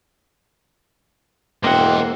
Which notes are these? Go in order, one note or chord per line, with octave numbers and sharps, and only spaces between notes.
E1 A#3 E4 C5 D#5 F#5 G5